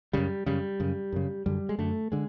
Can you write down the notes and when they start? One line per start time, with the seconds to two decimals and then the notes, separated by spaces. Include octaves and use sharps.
0.13 F#2 C#3 G3
0.46 F#2 C#3 G3
0.80 F#2 C#3
1.13 F#2 C#3
1.46 F#2 D3 G3
1.69 G#3
1.79 F#2 D3 A3
2.12 D3 G#3